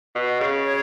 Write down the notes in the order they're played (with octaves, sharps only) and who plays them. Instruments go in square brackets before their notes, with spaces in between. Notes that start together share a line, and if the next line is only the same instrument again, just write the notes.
[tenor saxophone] B2
C#3
[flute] C#5